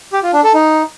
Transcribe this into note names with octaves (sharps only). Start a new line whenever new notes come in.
G4
F4
D4
A4
D#4